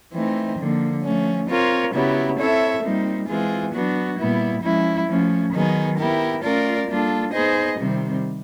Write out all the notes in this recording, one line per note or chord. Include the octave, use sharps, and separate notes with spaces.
E3 A3 C4 D#4
D3 F3 A#3
F3 A3 C#4
C4 F4 A#4 C#5
C#3 F#3 B3 E4 G4
C4 E4 A4 C#5 E5
A#2 G3 C4 D#4
E3 G#3 C4 F4 G#4
F#3 B3 D4 F#4
A#2 G3 B3 E4
F3 G#3 C#4 E4
F3 A3 C#4
D#3 F#3 B3 D#4 G#4
B3 E4 G4 A#4
A3 C#4 F4 A#4 D5
G3 A#3 D4 F4 A4
B3 D#4 G#4 C5 D#5
C3 D#3 G3 C4